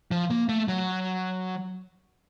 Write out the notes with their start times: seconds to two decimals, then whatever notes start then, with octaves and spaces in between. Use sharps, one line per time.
0.11 F3
0.30 A#3
0.49 A3
0.68 F#3